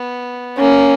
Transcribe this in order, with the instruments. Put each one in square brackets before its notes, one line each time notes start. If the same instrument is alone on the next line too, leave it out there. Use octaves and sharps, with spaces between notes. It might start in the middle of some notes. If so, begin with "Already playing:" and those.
Already playing: [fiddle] B3
[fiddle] A#3 [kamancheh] C#4